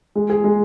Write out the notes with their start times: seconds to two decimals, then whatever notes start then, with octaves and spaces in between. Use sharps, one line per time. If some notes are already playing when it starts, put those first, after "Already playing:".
0.15 G#3
0.30 G#4
0.44 G#3